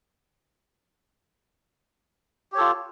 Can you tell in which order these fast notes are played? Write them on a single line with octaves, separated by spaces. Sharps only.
G4 C#5 A4 F4